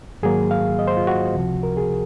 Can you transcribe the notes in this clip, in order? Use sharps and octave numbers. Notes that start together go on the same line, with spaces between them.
G#2 D#3 F#3 A#3 G#4
F5
D#5
C5
F4
F#4
C#2 C3 F3
A#4
G#4